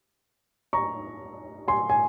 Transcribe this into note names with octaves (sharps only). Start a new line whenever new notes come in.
A#5 C#6
G#5 C6
G#5